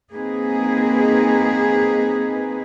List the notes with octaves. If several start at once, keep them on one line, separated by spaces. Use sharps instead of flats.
A#3 C4 D#4 G#4 B4